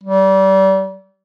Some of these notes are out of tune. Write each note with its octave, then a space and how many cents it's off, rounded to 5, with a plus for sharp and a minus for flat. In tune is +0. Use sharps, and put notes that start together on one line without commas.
G3 -30